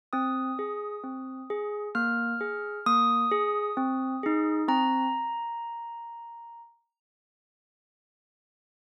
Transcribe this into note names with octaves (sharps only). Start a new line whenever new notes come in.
C4 D#6
G#4
C4
G#4
A#3 F6
G#4
A#3 D#6
G#4
C4
D#4 G#4
C4 A#5